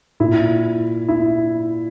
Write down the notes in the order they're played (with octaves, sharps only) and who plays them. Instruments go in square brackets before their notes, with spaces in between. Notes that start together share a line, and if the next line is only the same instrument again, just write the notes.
[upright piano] A#2 E4
E4